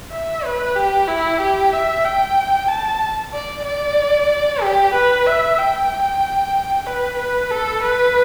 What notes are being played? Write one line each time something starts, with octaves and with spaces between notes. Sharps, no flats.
E5
B4
G4
E4
G4
E5
G5
A5
D5
D5
G4
B4
E5
G5
B4
B4
A4
B4